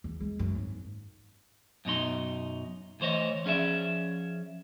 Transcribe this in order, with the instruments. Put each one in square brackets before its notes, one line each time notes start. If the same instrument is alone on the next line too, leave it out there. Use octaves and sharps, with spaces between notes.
[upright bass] E2
G#3
F#2
G#1
[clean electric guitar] F#2 B2 D#4 C6
D2 E3 C5 C#5 D#5
F3 C#4 G#4 D5 E5